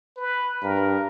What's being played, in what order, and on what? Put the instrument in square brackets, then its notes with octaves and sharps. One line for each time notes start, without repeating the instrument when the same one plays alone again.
[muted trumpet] B4
[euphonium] G2 [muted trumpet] A#4